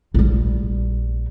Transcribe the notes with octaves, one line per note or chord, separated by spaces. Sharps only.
A#1 G3